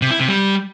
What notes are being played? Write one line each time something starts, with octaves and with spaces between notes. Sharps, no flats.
C3
E4
C3
G3